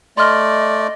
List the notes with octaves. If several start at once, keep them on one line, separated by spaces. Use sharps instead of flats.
A3 D5 D#5 C6 F6